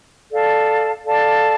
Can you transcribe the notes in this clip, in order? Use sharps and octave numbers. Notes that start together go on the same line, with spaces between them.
A4 D5 F5 A5
A4 D5 F5 A5